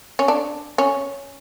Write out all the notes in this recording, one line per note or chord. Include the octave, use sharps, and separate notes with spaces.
C#4
D4
C#4